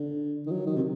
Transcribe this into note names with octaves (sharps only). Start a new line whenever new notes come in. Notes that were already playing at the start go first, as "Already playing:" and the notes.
Already playing: D3
D#3
F#3
D#3
C3